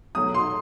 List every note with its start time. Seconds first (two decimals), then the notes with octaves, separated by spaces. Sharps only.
0.15 B2 F#3 A3 D#6
0.34 C6